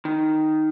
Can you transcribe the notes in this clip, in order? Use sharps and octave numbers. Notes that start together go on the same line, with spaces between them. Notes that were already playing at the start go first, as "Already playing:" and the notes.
D#3